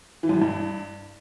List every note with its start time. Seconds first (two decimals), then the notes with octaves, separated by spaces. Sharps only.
0.23 E3
0.29 F#2
0.35 E3
0.42 G2